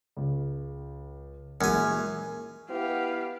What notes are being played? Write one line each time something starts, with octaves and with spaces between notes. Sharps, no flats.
C#2
F#2 A#2 E3 G#3 G#5
B3 E4 G4 F5